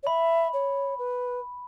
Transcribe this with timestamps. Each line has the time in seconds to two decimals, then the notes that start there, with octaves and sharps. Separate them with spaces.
0.03 C#5
0.07 E5 B5
0.53 C#5
0.99 B4